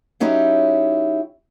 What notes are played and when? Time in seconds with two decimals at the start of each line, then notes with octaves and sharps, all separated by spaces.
0.20 F#3 C#4 D#4 E4 G4